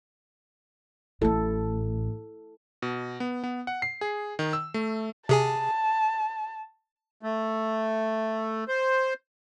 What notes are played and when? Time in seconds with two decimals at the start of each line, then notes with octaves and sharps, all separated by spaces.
1.22 A1 A2 E4 A4
2.82 B2
3.20 B3
3.44 B3
3.67 F#5
3.82 C7
4.01 G#4
4.39 D#3
4.53 E6
4.74 A3
5.29 C3 G#4 G#5 A5
7.22 A3
8.68 C5